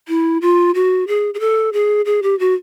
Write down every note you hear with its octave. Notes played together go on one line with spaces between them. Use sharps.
E4
F4
F#4
G#4
G#4
A4
G#4
G#4
G4
F#4